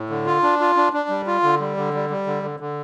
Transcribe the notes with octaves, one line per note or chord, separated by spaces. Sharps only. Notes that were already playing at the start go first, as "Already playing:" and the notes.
Already playing: A2
D3
F4
D4
F4
D4
D4
G3
F4
D3
G3
D3
G3
G3
D3
D3
D3